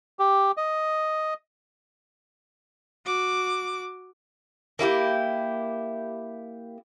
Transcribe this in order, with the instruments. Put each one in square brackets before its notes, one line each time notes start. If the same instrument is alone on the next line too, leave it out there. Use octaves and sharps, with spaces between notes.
[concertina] G4
D#5
[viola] F#4 D6
[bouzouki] A#3 E4 F#4 G4